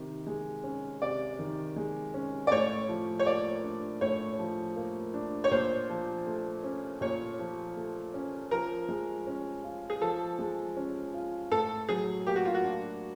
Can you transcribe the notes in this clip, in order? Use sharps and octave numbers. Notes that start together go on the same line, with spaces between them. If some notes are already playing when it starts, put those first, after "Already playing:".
Already playing: C3 D#3
G#3
C#4
C3 D5
D#3
G#3
C#4
D5
A2 C#5
F3
C#5
A#3 D5
D4
A2 C#5
F3
A#3
D4
C#5
A#2 C5
F3
A3
C#4
A#2 C#5
F3
A3
C#4
F3 A#4
G#3
C#4
F4
G#4
F3 A4
G#3
C#4
F4
A2 A4
F#3 G#4
A#3 G4
F#4
F4
F#4
D4